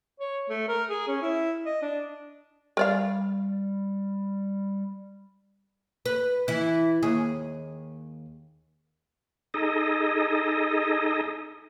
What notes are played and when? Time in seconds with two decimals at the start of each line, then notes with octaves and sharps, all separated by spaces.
0.20 C#5
0.50 A3
0.68 A#4
0.90 G#4
1.07 C#4
1.22 E4
1.66 D#5
1.82 D4
2.77 G3 A#4 D5 F5
6.05 B4
6.48 E3 E4
7.03 D#2 G#4
9.54 D#4 G#4 A4 D#5